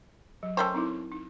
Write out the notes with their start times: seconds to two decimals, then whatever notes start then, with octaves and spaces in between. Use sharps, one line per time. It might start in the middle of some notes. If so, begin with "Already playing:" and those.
0.43 F#3
0.57 A3 C#4 A#4 C5 G5 A5
0.74 C4 D#4 E4
1.12 D#4